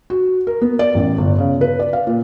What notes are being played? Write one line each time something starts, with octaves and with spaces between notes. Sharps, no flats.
F#4
A#4
B3
D5
A1
G1
C#3
B4
D5
F5
A#2